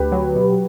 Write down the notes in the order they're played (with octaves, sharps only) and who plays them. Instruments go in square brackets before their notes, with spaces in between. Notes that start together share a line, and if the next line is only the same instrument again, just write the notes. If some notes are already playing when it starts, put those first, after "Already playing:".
Already playing: [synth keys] D2 [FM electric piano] G4 B4
[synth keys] F#3
B2